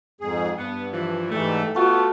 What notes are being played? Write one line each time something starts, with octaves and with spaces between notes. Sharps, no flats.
F2 G#2 G#4
G2 B3
E3 F3
G#2 E3 G3 A3
A3 B3 F4 F#4 A4